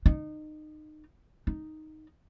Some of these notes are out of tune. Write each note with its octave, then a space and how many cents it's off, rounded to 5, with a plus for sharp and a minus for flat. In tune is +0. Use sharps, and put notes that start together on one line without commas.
D#4 -25
D#4 +0